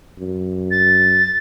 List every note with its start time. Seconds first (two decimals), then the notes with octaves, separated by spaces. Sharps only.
0.19 F#2
0.71 A6